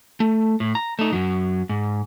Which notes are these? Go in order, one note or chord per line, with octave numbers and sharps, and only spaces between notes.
A3
A2
A#5
A3 D#4
F#2 F#3
G#2